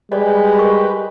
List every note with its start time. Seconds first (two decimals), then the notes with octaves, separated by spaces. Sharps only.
0.12 G3 G#3 G4 B4 D5 D#5
0.58 A#4 D#5 C#6